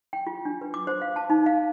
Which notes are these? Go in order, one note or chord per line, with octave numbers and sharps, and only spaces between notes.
G5
F4
D4
B4
D6
C5
F5
A5
D#4
F5